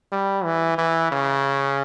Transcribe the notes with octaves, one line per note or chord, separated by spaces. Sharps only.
G3
E3
E3
C#3